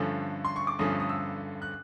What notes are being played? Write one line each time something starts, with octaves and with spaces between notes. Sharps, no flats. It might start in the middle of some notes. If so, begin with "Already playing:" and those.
Already playing: G2 D3 F3 A3 C#4
C6
C#6
D6
G2 D3 F3 A3 C#4 D#6
D#6
E6
F#6